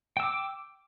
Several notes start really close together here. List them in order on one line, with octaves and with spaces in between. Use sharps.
G5 E6 D6